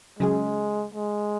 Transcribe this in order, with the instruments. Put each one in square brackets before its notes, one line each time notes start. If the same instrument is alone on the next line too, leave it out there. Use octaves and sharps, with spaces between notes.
[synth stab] C#3 F#3 C#4 G#4 [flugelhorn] G#3
[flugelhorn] G#3